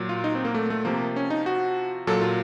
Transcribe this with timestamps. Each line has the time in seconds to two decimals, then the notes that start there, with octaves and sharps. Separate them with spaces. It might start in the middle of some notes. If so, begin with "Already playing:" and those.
Already playing: A#2 F#3
0.09 F4
0.24 D#4
0.35 C4
0.45 A#3
0.54 A3
0.70 A3
0.85 C3 F3 A#3
1.16 C#4
1.30 D#4
1.46 F#4
2.07 A#2 F#3 A4
2.22 F4